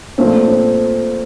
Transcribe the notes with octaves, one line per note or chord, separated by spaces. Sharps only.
A#2 F3 A3 C4
C4